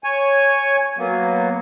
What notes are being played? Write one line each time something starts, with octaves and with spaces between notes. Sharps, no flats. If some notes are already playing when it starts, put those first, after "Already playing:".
C#5 G#5
F#3 A#3 B3